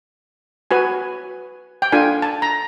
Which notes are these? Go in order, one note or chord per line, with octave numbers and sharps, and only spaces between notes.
F#4 B4 G#5
G5
D4 F4 A4 G#5
A5
A#5